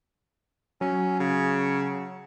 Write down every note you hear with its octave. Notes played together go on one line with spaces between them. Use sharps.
F#3 C#4
C#3